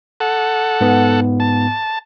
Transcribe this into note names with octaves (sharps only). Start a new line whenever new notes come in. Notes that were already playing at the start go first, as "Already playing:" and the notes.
A4 F#5
G#2 B3
A5